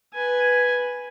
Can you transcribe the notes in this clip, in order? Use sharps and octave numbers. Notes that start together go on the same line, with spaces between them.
B4 G#5